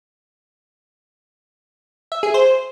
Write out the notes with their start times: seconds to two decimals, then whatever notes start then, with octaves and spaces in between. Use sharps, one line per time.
2.12 E5
2.23 G#4
2.34 C5